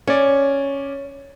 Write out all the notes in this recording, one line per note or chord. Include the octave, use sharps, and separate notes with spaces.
C#4 C#5 D5